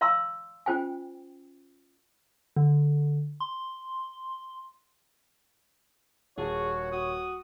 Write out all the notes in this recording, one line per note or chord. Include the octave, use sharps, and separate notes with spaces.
D5 F5 A#5 C6 E6
C#4 F4 C5 G5 G#5
D3
C6
D#1 F#4 G#4 C#5 A5
F#4 D#6